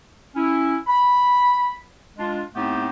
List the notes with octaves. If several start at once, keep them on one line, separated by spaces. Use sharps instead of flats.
C#4 E4
B5
G#3 D4 F4
A2 A3 B3 C4 D#4 G4